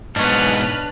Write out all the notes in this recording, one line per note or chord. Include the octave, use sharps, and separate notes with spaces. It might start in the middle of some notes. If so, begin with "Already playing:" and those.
G#2 B2 D4 B4 C#5 F6